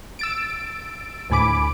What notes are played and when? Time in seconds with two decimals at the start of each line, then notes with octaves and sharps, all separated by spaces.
0.19 E6 A6 D7
1.30 D2 A2 G#5 B5 D6 D7